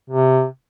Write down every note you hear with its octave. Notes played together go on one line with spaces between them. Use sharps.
C3